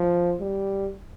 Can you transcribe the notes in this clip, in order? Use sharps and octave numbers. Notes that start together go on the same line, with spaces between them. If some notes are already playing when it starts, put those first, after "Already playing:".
Already playing: F3
G3